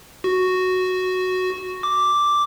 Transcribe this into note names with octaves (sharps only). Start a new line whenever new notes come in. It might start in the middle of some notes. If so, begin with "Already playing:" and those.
F#4
D6